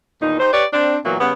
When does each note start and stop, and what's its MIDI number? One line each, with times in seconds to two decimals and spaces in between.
0.22 0.37 40
0.22 0.37 46
0.22 0.37 51
0.22 0.37 63
0.40 0.52 63
0.40 0.52 67
0.40 0.52 72
0.52 0.65 67
0.52 0.65 71
0.52 0.65 73
0.52 0.65 74
0.73 0.97 60
0.73 0.97 62
1.04 1.15 46
1.04 1.15 52
1.04 1.15 54
1.04 1.15 58
1.04 1.15 59
1.20 1.32 49
1.20 1.32 55
1.20 1.32 59